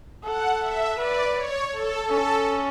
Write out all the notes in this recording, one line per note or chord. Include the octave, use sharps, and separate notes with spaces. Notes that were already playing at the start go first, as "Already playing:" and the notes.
A4 F#5
E5
B4 D5
C#5
A4
C#4 A4